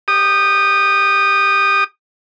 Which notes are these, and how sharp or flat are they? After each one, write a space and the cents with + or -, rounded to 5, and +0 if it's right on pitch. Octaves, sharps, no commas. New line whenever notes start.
G4 +0 D#6 -20